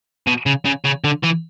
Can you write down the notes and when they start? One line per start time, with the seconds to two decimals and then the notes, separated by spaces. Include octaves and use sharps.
0.27 B2
0.46 C#3
0.65 C#3
0.85 C#3
1.04 D3
1.23 E3